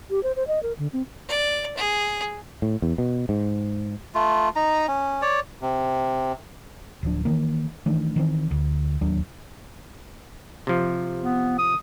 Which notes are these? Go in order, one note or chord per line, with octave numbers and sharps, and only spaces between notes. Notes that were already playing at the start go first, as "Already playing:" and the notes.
G4
C5
C5
D#5
A#4
D3
C4
D5
G#4
A2
E2
B2
G#2
A3 F4
D#4 A#5
C#4
C#5 D5
C3
D1 F3 D4
D#3 E3 A#3
D#3 E3 A3 D4
D#3 E3 C4
D2
D1 D#2 F#3 D4
C3 F3
B3
D#6